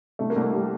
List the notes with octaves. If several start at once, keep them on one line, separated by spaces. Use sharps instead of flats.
C2 A3
A#3
C2
A#3
G3